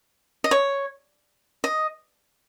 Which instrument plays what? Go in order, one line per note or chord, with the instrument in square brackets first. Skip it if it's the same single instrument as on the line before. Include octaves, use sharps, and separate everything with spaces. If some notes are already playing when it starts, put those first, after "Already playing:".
[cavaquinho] D#5
C#5
D#5